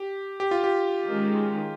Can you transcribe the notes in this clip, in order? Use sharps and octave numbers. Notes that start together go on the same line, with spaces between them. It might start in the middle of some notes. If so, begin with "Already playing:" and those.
Already playing: G4
G4
F4
G4
D#3 G#3 C#4